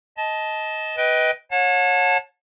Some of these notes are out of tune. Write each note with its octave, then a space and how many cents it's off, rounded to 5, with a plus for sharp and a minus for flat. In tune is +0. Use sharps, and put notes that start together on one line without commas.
D#5 +15 A5 -15
B4 +0 D#5 +20 G5 -5
C#5 -10 F#5 -40 A5 +0